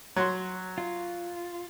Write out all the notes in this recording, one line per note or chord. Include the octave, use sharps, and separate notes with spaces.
F#3 F#4 C6
F4